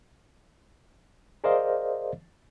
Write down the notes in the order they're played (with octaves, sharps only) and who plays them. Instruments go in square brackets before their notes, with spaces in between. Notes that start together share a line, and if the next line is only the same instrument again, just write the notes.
[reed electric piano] G#4 A#4 C5 D5 D#5 F5